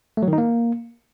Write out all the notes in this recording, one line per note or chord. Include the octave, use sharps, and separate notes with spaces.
A3
F#3
D#3
D#4
A#3